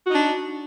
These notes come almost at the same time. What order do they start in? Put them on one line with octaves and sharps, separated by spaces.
F#4 D#4 D4